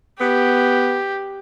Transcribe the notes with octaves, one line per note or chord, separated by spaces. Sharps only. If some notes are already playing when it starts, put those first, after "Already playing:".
B3 G4